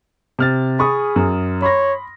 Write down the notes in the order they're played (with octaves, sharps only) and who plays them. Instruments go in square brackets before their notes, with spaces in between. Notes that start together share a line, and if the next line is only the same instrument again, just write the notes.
[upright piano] C3 F6 A6
[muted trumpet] G#4 [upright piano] B5 C#6 D#6
[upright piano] F#2
[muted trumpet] C#5 [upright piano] B5 C6 A#6